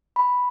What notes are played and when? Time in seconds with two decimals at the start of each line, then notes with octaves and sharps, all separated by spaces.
0.16 B5